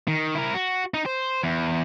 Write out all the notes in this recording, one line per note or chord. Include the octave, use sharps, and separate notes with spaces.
D#3
E4 A#4
F#4
D#4
C5
E2